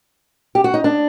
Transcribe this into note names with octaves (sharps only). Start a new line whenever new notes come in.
G4
F#4
D#4
D4